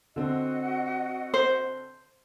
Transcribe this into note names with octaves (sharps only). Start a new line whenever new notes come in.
D3 C4 F#4 D#5 F#5
C5